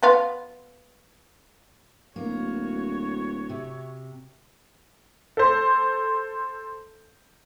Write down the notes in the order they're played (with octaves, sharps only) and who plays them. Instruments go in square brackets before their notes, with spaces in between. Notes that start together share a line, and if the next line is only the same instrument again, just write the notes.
[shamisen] B3 F4
[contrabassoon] D1 [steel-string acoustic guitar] A#3 [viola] F#4 C#5
[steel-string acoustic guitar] C3
[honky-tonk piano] A4 C5